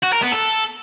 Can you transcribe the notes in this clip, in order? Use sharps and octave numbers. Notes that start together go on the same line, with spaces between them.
F#4
A#4
B3
A4